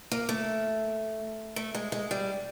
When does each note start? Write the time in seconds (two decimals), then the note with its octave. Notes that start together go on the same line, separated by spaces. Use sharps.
0.11 A#3
0.29 A3
1.56 A3
1.75 G#3
1.92 G#3
2.11 G3